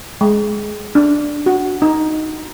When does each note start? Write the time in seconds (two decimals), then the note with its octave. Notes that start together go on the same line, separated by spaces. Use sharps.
0.21 G#3
0.95 D4
1.46 F#4
1.82 D#4